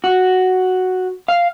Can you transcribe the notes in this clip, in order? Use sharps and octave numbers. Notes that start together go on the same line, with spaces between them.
F#4
F5